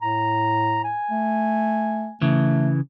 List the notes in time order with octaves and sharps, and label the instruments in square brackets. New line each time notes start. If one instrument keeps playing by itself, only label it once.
[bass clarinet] A2 [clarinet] A#5
[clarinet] G#5
[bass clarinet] A3
[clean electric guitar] C#3 E3 [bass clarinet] A3